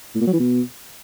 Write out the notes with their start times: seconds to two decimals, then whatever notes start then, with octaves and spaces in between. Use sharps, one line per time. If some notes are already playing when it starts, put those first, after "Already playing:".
0.15 A2
0.21 A#2
0.27 F#3
0.33 E3
0.39 B2